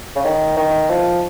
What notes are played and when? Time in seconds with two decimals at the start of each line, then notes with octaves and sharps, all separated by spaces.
0.15 C#3
0.24 D#3
0.57 D#3
0.90 F3